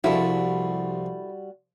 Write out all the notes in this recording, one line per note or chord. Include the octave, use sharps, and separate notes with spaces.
C2 F3 G3 E4 F#4 A4